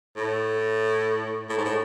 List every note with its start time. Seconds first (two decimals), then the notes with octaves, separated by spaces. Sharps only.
0.16 A2
1.49 A2
1.57 G#2
1.65 A2